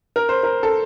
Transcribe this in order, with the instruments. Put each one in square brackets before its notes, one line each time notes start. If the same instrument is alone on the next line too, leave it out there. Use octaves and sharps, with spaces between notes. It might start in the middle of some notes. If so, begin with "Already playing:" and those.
[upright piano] A#4
C5
A#4
A4